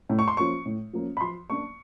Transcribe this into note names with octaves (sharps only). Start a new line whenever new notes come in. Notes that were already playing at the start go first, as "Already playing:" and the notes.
A2
C#6
C6
F3 A#3 C#4 C#6
A2
F3 A#3 C#4
B5
F3 C6
A#3 D4 C#6